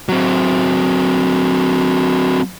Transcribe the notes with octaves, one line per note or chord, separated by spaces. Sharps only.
F#3 C4